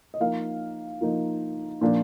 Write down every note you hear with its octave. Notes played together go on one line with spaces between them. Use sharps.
D#5
F3 A#3 D#4 F5
F3 A#3 D#4
A#2 F3 A#3 D4